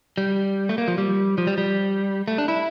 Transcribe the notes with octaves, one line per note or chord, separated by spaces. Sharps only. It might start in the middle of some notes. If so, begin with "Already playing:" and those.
G3
A3
A#3
F3
G3
F3
G3
G3
A3
D4
E4